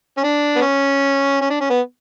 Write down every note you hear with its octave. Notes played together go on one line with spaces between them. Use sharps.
C#4
D4
B3
C#4
C#4
D4
C#4
B3